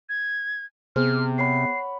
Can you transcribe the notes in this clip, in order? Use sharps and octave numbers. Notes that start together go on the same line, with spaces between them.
G#6
C3 B3 G#4 C5 F6
C#5 F#5 B5 C7